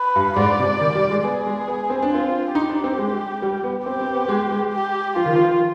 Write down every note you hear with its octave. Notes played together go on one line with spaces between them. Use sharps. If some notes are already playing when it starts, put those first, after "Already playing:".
Already playing: B4
G2
G#2 D5
C3
D#3
G3
G#3
B3 G#4
G#3
B3
C4
D4
C4 F4
D#4 G4
D4
C4
G#3
G3
B3
C4 G4
C4
B3
G#3
G#3
G4
F3 F4
D#3
F3